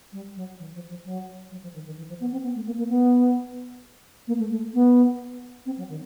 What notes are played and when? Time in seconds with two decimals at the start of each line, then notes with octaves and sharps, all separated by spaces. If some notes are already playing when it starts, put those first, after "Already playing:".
0.12 G3
0.35 F#3
0.58 E3
0.74 F3
0.89 F3
1.04 F#3
1.50 F#3
1.62 F3
1.73 D#3
1.85 D#3
1.97 E3
2.08 F3
2.20 B3
2.31 C4
2.42 B3
2.54 A3
2.65 A#3
2.77 A#3
2.88 B3
4.27 A#3
4.38 A3
4.50 A3
4.73 B3
5.65 C4
5.77 F#3
5.88 D#3